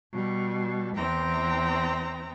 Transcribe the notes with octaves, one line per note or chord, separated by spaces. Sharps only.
B2 G3
E2 E3 C4 G5 A#5